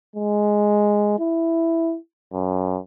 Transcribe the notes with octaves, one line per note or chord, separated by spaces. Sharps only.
G#3
E4
F#2